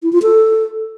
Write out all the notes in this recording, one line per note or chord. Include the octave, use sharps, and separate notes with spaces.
E4
F4
A4